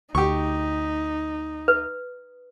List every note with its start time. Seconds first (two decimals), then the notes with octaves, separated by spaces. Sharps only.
0.15 D2 D#4 G4 C#6
1.68 B4